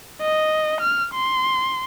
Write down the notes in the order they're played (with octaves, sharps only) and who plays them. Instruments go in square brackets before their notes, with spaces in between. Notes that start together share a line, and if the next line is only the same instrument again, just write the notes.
[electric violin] D#5
F6
C6